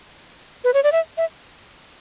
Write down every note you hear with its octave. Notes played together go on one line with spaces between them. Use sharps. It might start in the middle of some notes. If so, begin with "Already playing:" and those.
B4
C#5
D5
E5
E5